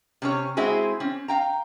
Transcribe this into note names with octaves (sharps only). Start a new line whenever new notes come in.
C3 C#4 C#5
G#3 C4 E4 F#4 G#4
C4 C#4
F5 G5 A#5